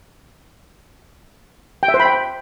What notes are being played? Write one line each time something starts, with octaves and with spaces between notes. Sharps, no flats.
G5
E5
C5
B5
G5